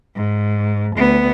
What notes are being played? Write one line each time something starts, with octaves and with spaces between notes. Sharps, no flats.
G#2
D2 B3